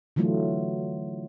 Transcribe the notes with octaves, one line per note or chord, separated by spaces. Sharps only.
D3 E3 F#3 A3 F4